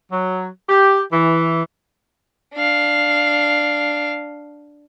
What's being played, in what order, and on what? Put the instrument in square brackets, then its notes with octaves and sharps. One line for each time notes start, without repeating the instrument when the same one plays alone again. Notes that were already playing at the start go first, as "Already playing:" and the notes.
[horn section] F#3
G4
E3
[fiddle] D4 F5